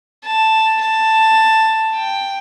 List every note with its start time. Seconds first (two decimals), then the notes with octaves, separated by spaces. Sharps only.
0.25 A5
0.81 A5
1.96 G5